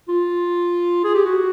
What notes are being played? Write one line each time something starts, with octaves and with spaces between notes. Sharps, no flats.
F4
G#4
G4
F#4